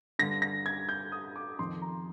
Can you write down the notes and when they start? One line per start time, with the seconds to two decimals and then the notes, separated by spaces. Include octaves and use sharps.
0.19 G2 D3 A#6
0.42 A#6
0.66 G#6
0.89 G6
1.12 D#6
1.36 D6
1.59 F2 D#3 C6
1.82 A#5